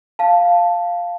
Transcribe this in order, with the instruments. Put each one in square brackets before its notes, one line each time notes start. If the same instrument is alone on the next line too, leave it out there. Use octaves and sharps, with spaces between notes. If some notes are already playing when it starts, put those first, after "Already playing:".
[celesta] F5 A5